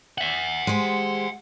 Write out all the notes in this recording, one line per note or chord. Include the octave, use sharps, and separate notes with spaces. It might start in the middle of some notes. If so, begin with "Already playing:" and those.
E5 F#5
G#3 G4 C5